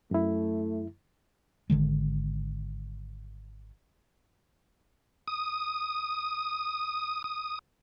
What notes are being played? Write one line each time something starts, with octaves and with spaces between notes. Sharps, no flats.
F#2 A3 E4
G#1 D3 D#3 G#3
D#6
D#6